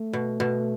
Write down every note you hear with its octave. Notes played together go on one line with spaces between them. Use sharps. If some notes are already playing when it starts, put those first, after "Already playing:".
Already playing: A3
B2
B2